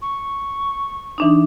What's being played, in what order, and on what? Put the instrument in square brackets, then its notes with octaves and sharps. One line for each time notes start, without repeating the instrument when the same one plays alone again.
[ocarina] C#6
[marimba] E3 D4 D#4